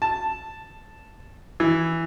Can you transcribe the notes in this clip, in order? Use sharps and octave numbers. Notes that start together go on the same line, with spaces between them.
A5
E3